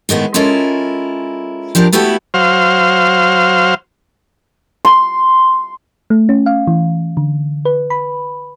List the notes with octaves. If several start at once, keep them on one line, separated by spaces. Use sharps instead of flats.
A2 D#3 G#3 B3
G#3 C#4 E4 F4 A4 A#4
F3 D4 G4 A#4
A3 B3 E4 F#4 G4 A4
F#3 C5 F5
C6
A3
C#4
F5
E3
D3
B4
B5